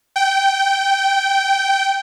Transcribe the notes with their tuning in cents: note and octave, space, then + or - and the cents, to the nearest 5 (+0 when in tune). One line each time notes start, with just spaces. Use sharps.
G5 -15